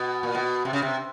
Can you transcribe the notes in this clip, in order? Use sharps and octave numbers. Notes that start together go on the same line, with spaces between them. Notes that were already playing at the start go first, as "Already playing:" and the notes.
Already playing: B2
A#2
B2
C3
C#3
C3